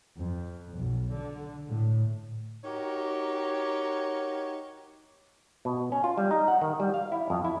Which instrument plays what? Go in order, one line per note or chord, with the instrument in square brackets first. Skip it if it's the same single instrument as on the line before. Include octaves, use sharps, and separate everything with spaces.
[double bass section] F2
B1
D3
A2
[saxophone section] D#4 F#4 G4 A#4 C#5
[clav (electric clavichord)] B2
C#4
F4
G3
D#4
F#5
D#3
G3
F5
E4
F2
E4